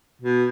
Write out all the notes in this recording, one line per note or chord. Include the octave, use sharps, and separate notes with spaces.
B2